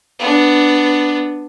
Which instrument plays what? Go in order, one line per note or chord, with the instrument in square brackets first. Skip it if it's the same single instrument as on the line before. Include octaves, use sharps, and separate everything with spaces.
[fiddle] B3 D4